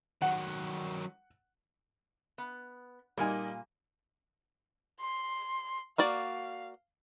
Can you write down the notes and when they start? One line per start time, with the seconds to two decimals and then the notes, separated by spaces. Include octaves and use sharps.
0.22 D#3 F#3 F#5
2.38 B3
3.18 A#2 G3 A#3 D#4 G#5
5.00 C6
5.98 A#3 F#4 D5 F5